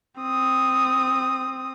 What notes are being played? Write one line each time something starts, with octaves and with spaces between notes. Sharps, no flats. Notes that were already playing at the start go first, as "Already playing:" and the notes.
C4 D#6